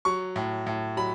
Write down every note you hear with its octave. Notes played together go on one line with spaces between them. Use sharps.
F#3 C#6
A2
A2
F#3 B5